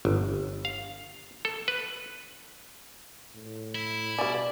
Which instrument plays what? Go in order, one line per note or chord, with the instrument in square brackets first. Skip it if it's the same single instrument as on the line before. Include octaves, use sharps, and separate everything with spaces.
[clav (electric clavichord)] G1
F5
A4
B4
[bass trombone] A2
[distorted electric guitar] E4
[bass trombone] B2 [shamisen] G3 G#5 [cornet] D5